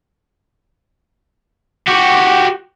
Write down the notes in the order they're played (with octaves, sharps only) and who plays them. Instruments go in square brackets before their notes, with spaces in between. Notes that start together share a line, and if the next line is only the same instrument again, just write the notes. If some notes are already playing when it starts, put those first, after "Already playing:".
[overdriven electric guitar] F#4 G4